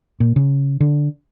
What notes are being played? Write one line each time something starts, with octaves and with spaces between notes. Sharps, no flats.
A#2
C#3
D3